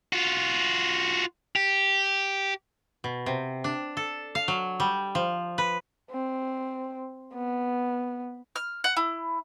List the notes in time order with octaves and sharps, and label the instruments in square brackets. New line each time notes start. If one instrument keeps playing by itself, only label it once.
[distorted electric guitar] F4 F#4
G4
[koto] B2
C3
D4
A4
F5
F#3
G3
F3
B4
[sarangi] C4
B3
[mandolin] F6
F#5
E4